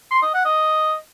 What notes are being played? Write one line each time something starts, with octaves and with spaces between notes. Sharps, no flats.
C6
D#5
F#5
D#5